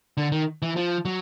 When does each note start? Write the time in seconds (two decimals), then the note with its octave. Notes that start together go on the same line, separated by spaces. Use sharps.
0.17 D3
0.32 D#3
0.62 E3
0.76 F3
1.05 F#3